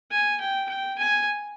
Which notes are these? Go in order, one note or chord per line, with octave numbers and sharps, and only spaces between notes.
G#5
G5
G5
G#5